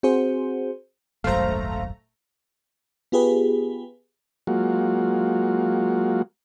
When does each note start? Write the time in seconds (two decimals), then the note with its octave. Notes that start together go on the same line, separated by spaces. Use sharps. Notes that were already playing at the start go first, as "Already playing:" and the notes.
0.03 C4 F#4 G#4 C5
1.24 D#1 G#1 F#2 A3 C5 F5 A#5
3.12 B3 F4 G4 G#4 B4
4.47 F#3 G#3 A#3 F4 F#4